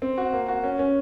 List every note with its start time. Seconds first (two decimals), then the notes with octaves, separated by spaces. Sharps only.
0.02 C4
0.18 F#4
0.33 A#3
0.48 F#4
0.64 C#4
0.79 C#4